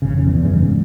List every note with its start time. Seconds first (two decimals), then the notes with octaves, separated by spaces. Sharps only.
0.02 G#1 C#3
0.14 F1
0.27 E2
0.43 E2 G2 C#3
0.62 G#2